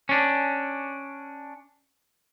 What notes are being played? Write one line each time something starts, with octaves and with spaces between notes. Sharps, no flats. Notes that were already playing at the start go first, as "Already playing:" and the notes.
C#4 D4